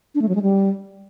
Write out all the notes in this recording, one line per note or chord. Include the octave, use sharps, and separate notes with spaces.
D4
A3
F#3
G#3
G3